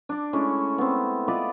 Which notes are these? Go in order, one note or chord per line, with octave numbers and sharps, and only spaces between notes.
D4 D5
G#3 A3 C#4 E4
B3 C4
F4 B4 D5 D#5